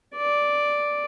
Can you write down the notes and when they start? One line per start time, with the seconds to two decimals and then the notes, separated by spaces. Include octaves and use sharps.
0.16 D5